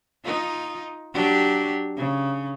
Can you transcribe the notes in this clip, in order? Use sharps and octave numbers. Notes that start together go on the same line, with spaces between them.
D#4 F4
F#3 D4 G4
C#3